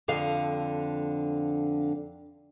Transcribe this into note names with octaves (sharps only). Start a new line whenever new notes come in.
F2 D3 F5